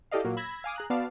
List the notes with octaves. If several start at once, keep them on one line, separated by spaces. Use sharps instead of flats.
E4 G4 A4 D5 D#5 F5
A#2 F#3 A#3
B5 E6 G#6 A#6
F5 G#5 D6 D#6
G#4 A#5 F#6
B3 F#4 D5 F5 A5